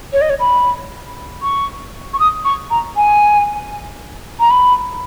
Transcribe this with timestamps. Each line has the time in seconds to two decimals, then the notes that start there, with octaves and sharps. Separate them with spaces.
0.13 C#5
0.21 D#5
0.30 C#5
0.40 B5
1.42 C#6
2.14 C#6
2.20 D#6
2.45 C#6
2.70 A#5
2.96 G#5
4.40 A#5
4.50 B5